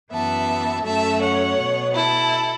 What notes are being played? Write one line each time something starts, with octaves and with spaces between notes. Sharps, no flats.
F#2 E3 B3 E5 A5
F#2 F#3 A3 C#4 E5 A5
C#5 F#5
B2 B3
E4 A4